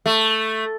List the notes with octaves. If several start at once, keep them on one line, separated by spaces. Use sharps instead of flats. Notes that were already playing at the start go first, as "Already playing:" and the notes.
A3